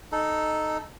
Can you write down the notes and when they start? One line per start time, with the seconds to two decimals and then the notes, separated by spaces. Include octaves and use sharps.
0.12 D#4 A4